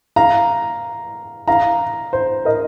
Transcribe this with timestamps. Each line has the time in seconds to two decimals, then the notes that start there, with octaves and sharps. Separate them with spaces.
0.16 F5 A#5
1.48 F5 A#5
2.13 C5
2.45 A#4 D#5